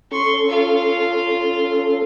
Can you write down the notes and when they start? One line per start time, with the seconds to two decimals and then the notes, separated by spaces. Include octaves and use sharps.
0.12 C#4 A4 C6 C#6
0.49 F4 F5